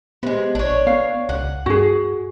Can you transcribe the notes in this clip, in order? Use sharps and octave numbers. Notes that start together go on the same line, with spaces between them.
C3 G#3 B3
A1 D4 C#5
B3 F5
C#2 F#5
G2 F#4 G#4